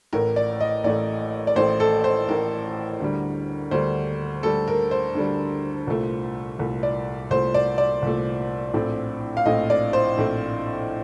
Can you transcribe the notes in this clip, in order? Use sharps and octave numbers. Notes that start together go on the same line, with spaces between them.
A1 A2 A3 A#4
D5
D#5
A1 A2 A3 D5
D5
A1 A2 A3 C5
A4
C5
A1 A2 A3 A#4
D2 D3 G3
D2 D3 G3 C5
D2 D3 G3 A4
A#4
C5
D2 D3 G3
C2 A#2 A3
C2 A#2 A3
D5
C2 A#2 A3 C5
D5
D5
C2 A#2 A3
A#1 A2 A3 C4
F5
A#1 A2 A3 C4 D#5
D5
C5
A#1 A2 A3 C4